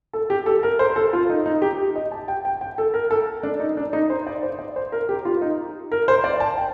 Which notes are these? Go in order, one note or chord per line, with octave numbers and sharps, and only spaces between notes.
A4
G4
A4
A#4
C5
A4
F4
D#4
D#4
G4
D#5
A5
G5
G5
G5
A4
A#4
A4
D4
D#4
D4
D#4
C5
D5
C5
D5
C5
A#4
G4
F4
D#4
A#4
C5
D5
A5
G5